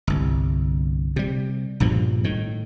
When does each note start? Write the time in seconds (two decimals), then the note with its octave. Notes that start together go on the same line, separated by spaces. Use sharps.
0.07 G1 C2
1.16 C3 G3
1.80 A#1 G2 B2 F3
2.24 A2 D#3